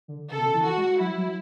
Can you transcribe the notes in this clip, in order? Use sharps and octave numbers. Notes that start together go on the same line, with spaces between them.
D3
C#3 A4
B2
C#3
E3
F#4
G#3
F#3 E4
F#3